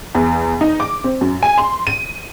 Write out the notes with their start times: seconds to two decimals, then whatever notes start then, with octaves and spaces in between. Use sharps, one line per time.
0.15 E2
0.61 D#4
0.80 D6
1.04 C4
1.21 F#2
1.43 G#5
1.58 C6
1.87 D#7